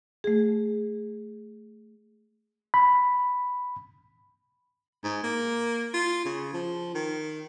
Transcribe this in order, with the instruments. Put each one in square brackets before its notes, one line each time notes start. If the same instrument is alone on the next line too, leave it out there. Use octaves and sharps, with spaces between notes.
[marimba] A3 G#4
[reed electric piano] B5
[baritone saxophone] G#2
A#3
F4
C#3
F3
D#3